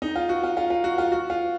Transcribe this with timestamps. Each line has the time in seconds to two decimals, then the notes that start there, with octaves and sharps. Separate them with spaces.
0.02 D#4
0.16 F4
0.29 F#4
0.44 F4
0.57 F4
0.70 F4
0.84 F#4
0.98 F4
1.12 F#4
1.30 F4